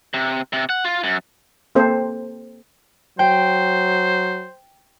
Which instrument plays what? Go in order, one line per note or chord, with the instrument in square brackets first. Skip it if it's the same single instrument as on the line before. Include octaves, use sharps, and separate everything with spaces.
[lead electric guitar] C3
C3
F#5
F4
F#2
[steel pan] A#3 C4 A4 C5
[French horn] F#3 [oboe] C5 [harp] G5